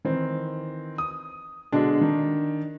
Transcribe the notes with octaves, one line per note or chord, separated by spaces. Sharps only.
D#3 E3 C4
D#6
B2 D3 G#3 D4
D#3